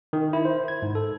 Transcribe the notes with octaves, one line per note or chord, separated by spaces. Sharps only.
D#3
E4
C5
G#6
G#2
A4